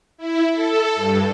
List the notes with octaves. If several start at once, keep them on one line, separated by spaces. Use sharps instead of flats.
E4
A4
G2